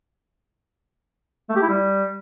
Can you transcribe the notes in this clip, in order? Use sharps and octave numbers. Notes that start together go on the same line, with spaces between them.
A3
G4
E4
G3